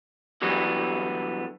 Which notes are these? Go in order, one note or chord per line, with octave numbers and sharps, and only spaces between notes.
D3 E3 F#3 G3 B3